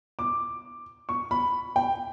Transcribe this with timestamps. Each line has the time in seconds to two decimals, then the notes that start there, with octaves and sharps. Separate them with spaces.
0.19 D6
1.09 C#6
1.31 B5
1.76 G5